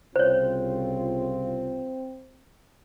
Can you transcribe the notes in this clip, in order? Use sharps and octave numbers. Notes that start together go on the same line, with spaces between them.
C2 C#3 C4 F4 C5 C#5